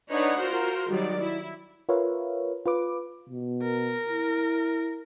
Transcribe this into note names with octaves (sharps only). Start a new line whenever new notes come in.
D4 D#4 B4 C#5 F#5
F4 F#4 A#4 C5
D#3 F#3 G3 D5
E4
F4 A#4 B4 C#5 E5 F5
F4 B4 D6
B2
A#4
E4